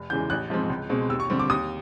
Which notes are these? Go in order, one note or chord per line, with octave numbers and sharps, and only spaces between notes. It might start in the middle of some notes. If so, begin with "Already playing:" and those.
Already playing: F1
E2 C#3 E3 G#3 G6
A1 F#6
G#2 F3 G#3 C4
C#2
B2 G#3 C4
D#2 E6
C#6
D3 G3 C4
D6
D#2 D#6